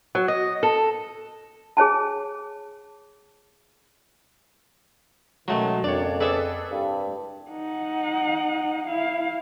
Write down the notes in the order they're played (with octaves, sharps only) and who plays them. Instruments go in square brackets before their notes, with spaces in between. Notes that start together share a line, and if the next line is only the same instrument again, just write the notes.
[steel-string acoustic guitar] F#3
D#5
A4
[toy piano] G#4 C#5 G#5 A5
[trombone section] F#2 D#3 [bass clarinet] B2 [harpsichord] F#3 A3 [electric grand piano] G#3
[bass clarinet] F2 [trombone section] C#3 A#3 [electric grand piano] D4 C#5 [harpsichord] D5
[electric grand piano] G#4 A4 B4 [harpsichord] D5 E5 D6
[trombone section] C2 G2
[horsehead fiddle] D#4 F#5
E4 F5